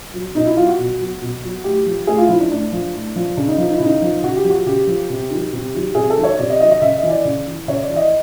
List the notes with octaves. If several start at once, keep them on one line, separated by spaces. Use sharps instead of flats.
F#3
B2 D#4
E4
F#3 F4
F#4
B2
F#3
B2
F#3
A2 G4
F3
A2 G#4
F4
F3 E4
D4
A2 D4
F3
A2
F3
C#3 D4
D#4
F3
D#4
E4
C#3 D#4
F3
C#3 F#4
G4
F3
F#4
C#3 G4
F3
C3
D#3 F#3
C3
D#3 F#3
C3 G#4
A4
D#3 F#3
C#5
C3 D5
D#5
D#3 F#3 D#5
D#5
C#3 E5
D#5
E3
D5
C#3
E3
C#3 C#5
D5
E3
D#5